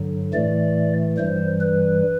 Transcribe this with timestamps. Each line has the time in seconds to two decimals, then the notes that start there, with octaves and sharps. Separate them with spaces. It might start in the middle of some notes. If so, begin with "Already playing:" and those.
Already playing: G2 D3 F#3
0.33 A2 E3 A3 D5
1.17 G2 E3 G3 C5
1.61 B4